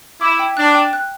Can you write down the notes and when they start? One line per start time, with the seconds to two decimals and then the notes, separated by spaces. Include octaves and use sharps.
0.21 E4 D6
0.39 G5
0.57 D4 F#6
0.75 G5
0.93 F#6